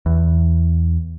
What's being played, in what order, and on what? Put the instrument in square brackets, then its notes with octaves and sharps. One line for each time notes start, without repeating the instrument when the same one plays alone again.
[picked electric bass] E2